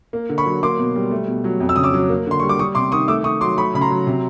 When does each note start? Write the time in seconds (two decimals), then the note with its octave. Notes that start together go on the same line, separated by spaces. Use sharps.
0.13 A#3
0.29 D3
0.38 B5 C#6
0.46 F#3
0.63 A#3 C6 D6
0.79 B2
0.96 G3
1.11 A3
1.28 B2
1.44 F#3
1.60 F2
1.69 E6
1.76 C#3 D#6
1.83 D6 E6
1.94 F#3
2.09 A#3
2.27 D3 C6
2.40 G3 C#6
2.49 D6
2.59 G3 C#6 D#6
2.75 C3 C6 D6
2.92 D#3 C#6 D#6
3.08 A3 D6 E6
3.24 D#3 C#6 D#6
3.41 F#3 C6 D6
3.58 A3 B5 C#6
3.74 C#3 B5
3.81 A#5 C6
3.91 F#3
4.07 C3